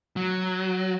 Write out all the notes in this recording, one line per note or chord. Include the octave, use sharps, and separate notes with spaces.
F#3